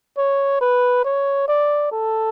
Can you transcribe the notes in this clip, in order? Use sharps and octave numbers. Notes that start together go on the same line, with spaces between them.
C#5
B4
C#5
D5
A4